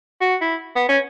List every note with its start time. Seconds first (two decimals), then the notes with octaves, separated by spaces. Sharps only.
0.21 F#4
0.41 E4
0.75 B3
0.89 C#4